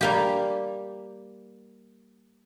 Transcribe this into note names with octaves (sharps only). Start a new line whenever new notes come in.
G3 A#3 G4